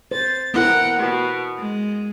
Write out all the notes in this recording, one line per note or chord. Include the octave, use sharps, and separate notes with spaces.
C5 A6
B3 E4 A#4 F#5 G5 A#5
B2
G#3